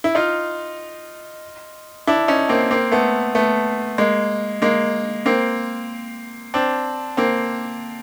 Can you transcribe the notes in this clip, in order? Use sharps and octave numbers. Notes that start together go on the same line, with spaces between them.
E4
D#4 F4
D4 E4
C#4 D#4
A#3 C4
A#3 C4
A3 B3
A3 B3
G#3 A#3
G#3 A#3
A#3 C4
C4 D4
A#3 C4